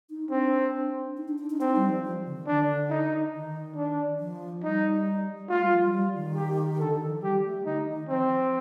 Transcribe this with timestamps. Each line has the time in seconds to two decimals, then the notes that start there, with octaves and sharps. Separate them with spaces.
0.10 D#4
0.30 C4 D4
1.17 D#4
1.28 D4
1.38 D4
1.50 D#4
1.60 C4 D#4
1.76 G3
1.89 F3
2.04 F3
2.26 D3
2.36 D#3
2.47 D3 D4
2.90 D#4
3.33 D#3
3.76 D4
4.19 F3
4.63 G3 D#4
5.49 A3 F4
5.60 G3
5.72 F3
5.82 G3
5.93 G3
6.15 D#3
6.36 G4
6.80 D3 A4
6.95 D#3
7.10 F3
7.22 G3 G4
7.45 A3
7.66 D3 D#4
7.88 D#3
8.09 F3 C4